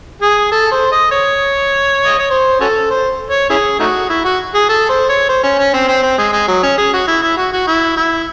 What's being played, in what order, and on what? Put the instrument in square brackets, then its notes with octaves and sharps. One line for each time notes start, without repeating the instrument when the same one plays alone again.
[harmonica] G#4
A4
C5
D#5
C#5
D#5
C#5
C5
C#4 F#4 A4
C5
C#5
C#4 E4 G#4
A3 D#4 F#4
E4
F#4
G#4
A4
C5
C#5
C5
C#4
C#4
C4
C4
C4
G#3
G#3
F#3
C#4
G#4
F#4
E4
E4
F#4
F#4
E4
E4